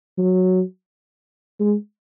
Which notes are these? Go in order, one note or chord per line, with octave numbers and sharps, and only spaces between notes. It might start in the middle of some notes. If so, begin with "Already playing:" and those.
F#3
G#3